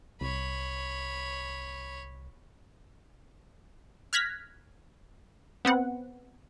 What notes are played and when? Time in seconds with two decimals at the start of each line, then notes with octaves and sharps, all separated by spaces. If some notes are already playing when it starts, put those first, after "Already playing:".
0.21 C2 C#5 B5
4.13 F6 F#6 G#6 A#6 B6
5.65 B3 C4 F#5